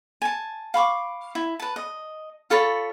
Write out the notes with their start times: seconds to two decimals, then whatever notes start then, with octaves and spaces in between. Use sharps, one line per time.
0.22 G#5 A5
0.74 F5 B5 C#6 D6
1.35 E4
1.60 B4 A5
1.76 D#5
2.50 F4 A4 C#5 B5